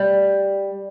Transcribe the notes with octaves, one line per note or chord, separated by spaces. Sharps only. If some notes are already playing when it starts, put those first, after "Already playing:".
Already playing: G3